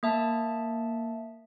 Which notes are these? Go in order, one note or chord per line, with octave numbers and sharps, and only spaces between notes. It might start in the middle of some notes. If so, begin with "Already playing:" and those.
A#3 E5 A5